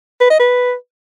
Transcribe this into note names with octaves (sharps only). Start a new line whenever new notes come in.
B4
D#5
B4